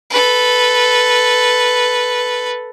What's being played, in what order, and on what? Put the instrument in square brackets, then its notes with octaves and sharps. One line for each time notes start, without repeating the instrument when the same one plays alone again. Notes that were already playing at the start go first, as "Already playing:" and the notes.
[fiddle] A4 B4